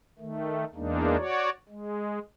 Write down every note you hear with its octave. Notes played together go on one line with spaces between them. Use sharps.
D#3 A3
E2 G#3 A#3 D4 D#4
F#4 C#5 D5
G#3